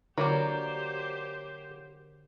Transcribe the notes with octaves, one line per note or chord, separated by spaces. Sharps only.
D3 F#3 A#3 G4 A#4 C5 D5